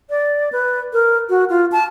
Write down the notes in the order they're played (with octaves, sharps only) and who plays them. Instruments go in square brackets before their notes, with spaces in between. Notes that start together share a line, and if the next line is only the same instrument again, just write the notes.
[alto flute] D5
B4
A#4
F#4
F4
A5